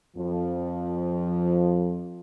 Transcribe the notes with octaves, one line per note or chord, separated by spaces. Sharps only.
F2 F3